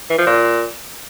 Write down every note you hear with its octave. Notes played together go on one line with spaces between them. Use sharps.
E3
F3
A#2